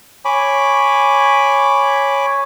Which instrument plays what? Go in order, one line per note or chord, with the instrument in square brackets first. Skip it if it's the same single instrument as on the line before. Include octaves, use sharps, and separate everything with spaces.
[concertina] C#5 G#5 B5 D6